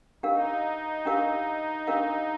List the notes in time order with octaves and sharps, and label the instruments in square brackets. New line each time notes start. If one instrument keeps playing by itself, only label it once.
[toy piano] D4 G4 A#4 F5 [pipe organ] D#4
[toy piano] D4 G4 A#4 F5
D4 G4 A#4 F5